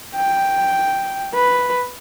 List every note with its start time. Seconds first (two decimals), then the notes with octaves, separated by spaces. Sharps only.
0.15 G5
1.34 B4